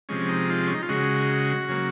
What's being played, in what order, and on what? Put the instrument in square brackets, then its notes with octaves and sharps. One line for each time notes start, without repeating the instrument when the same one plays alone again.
[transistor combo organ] C3 F3 G#3 C#4
D#4
F4
C#4
D#4
F4
C#3 G#3 F#4
C#3 F#3 A#3